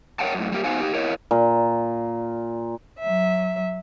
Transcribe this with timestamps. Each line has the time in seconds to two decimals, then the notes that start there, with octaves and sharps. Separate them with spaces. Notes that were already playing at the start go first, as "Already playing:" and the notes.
0.19 A#4 C5 C#5 F#5 G5 A5
0.34 F#2 A2
0.52 G3 A#3 D#4 G4
0.64 B3 D#4 F#4 C5 F5 G#5
0.80 D#4 G4
0.94 E4 A#4 C#5 D#5
1.31 A#2
2.99 F#3 E5